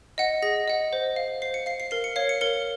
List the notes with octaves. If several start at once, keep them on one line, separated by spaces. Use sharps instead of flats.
D#5 F#5
G#4 A#6
D#5 F#5
C5
F5
C5 C7
C#7
F5 C7
C7
A#4 C7
C#7
C#5 F5 C7
C#7
A#4 C#7